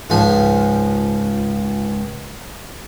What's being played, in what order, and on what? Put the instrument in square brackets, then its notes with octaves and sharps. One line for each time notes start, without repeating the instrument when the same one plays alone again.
[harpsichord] C#2 G#2 F3 G#5